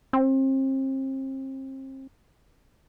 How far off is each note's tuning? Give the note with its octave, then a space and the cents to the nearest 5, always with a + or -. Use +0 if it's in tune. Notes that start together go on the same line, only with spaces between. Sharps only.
C4 +35